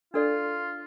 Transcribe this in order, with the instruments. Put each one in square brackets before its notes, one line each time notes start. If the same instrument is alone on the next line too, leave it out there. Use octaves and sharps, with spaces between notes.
[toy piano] D4 A4 D5 [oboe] F4